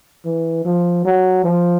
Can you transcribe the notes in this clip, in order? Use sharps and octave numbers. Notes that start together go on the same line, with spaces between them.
E3
F3
F#3
F3